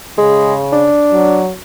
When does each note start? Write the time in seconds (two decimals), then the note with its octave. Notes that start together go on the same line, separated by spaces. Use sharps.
0.18 C#3 G#3
0.73 D4
1.12 F#3